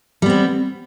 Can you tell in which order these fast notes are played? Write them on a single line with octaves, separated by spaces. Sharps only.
G3 B3 C4